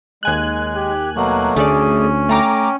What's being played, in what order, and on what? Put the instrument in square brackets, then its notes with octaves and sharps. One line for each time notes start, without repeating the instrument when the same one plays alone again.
[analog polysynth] D#2 G#5 F#6 [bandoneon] G#3
[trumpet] G4
[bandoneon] B2 F#3 A3 [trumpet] A#3
[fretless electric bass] D2 [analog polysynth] A3 D5 [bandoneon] C#4 [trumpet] G#4
[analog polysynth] A3 A#5 D6 [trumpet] G5